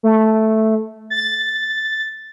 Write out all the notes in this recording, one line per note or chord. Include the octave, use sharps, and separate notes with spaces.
A3
A6